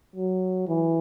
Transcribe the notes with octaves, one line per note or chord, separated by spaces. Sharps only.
F#3
E3